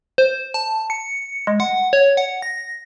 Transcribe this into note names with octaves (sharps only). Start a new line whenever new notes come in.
C5
A5
C#7
G#3
F#5
C#5
F#5
A#6